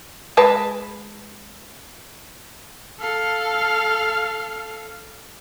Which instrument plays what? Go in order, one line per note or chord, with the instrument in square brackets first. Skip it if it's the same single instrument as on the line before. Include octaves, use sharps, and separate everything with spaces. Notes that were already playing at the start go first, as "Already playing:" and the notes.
[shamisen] G#3 B4 A5
[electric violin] A4 F5